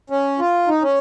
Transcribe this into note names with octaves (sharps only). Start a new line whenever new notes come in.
C#4
F4
D#4
C#4